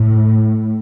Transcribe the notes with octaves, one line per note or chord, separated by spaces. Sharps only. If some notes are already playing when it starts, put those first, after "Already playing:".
Already playing: A2